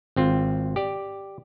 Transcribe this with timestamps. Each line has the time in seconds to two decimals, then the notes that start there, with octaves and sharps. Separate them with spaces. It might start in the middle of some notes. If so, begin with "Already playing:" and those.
0.16 G#1 C4 F4
0.76 G4 D5